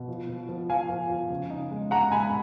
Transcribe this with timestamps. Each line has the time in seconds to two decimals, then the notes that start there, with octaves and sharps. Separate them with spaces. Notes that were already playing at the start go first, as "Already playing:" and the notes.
Already playing: B2
0.08 F3
0.29 F3
0.49 F3
0.70 F3 F5 G#5
0.90 F3
1.10 F3
1.30 C#3
1.50 D#4
1.71 G#3
1.91 G#3 F#5 A#5
2.12 G#3 G#5 B5